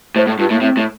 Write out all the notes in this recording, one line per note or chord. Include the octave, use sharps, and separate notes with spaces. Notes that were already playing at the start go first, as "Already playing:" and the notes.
A2 C5
A2
G2 F4
A2 A#3
A2 C4
A2